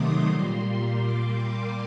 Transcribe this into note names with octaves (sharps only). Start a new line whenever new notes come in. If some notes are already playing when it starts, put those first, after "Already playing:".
Already playing: C3 D#3 F#3 A3 C6 D6 D#6
A#2 G3 A#3
D6